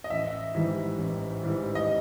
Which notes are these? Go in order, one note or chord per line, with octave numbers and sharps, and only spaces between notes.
D#5
A1 E5
G#2 E3 G3
A1
G#2 E3 G3
D#5